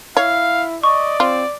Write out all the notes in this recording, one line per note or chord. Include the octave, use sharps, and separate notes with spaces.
E4 C#5 F5
D5 D#5 C#6
C4 F4